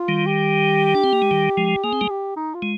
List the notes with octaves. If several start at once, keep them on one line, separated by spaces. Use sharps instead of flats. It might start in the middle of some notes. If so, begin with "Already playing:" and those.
Already playing: F4
D#3 G3
G4
D4
C4
A#3
G#3
D#3 G3
F3 G#3
A#3 G#4
C4
G3 A#3
G4
D#4
F4
G#3